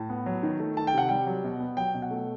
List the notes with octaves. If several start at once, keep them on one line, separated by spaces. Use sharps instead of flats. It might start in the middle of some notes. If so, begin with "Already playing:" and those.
Already playing: A2 A5
B3
F#3
D#3
A3
D#3 A5
G5
C3 F#5
G3 G5
F#3
B2
B3
F#3 G5
B2
F#5
A3